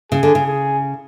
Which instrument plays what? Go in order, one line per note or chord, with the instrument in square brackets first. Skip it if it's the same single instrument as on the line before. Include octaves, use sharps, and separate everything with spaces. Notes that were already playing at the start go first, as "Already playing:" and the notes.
[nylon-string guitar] C#3 [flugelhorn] G#4
[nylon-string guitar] D3
C#3
[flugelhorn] G#4